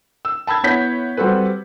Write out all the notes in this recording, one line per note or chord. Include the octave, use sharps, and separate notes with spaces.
E6
A5 B5 E6 G#6
B3 E4 C#5 G6 B6
G3 C4 F#4 A4 B4